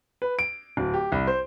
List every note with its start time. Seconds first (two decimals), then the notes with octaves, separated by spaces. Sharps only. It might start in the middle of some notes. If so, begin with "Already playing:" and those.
0.22 B4
0.39 D7
0.77 D1
0.94 G4
1.12 C2
1.27 C5